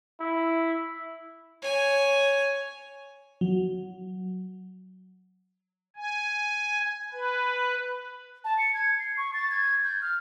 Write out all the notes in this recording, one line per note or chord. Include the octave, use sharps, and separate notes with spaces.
E4
C#5 G#5
F#3
G#5
B4
A5
C#7
G#6
C7
C#6
A6
G#6
G6
F6